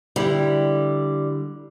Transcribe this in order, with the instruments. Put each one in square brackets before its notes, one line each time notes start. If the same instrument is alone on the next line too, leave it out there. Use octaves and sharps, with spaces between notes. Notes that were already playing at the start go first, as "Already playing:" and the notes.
[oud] D3 E4 G4 [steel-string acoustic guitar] G3